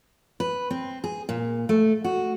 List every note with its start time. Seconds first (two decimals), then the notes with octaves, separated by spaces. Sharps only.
0.40 B4
0.71 C4
1.04 G#4
1.29 A#2
1.69 A3
2.04 F#4